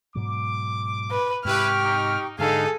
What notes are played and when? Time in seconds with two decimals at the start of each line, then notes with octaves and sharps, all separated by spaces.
0.15 G#2 B2 F#3 D6
1.11 B4
1.45 G#2 C3 E4 G4 B4 G5 C#6 F6
1.83 D#4
2.39 G#2 D3 D#4 G#4 A4 B4 E5 F5